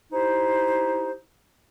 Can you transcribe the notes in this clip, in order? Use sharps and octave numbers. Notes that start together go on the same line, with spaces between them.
D#4 E4 G4 C5